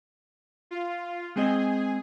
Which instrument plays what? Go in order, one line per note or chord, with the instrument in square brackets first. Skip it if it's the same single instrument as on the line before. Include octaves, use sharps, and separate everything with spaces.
[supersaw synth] F4
[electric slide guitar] G#3 C4 D#5 [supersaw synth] G#4